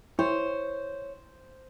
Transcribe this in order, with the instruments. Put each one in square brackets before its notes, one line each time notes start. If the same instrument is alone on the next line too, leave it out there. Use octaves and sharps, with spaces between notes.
[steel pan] E4 [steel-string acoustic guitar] C5 [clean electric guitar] C#5